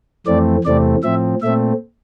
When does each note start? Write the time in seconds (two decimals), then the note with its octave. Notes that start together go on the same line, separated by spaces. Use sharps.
0.27 F2 E3 A3 C4 D5
0.64 E2 C3 E3 A3 C4 D5
1.03 A2 F3 C4 E5
1.42 A#2 A3 C4 E5